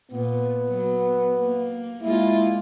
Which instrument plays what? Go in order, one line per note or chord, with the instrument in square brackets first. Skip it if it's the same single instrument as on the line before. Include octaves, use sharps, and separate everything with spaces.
[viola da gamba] A#2 [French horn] B3
[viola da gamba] F#3
A#3
[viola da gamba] G#3 A#3 F4 [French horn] E4